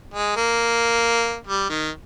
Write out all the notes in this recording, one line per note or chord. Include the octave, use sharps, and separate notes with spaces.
G#3
A#3
G3
D#3